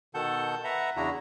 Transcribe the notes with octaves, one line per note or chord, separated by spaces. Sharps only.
B2 D#3 A4 F#5 A5 G6
B4 E5 F#5 A#5
E2 C#3 D4 E4 F#4 A#5